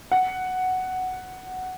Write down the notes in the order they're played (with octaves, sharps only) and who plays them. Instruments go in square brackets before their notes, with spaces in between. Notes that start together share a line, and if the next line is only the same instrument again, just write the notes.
[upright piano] F#5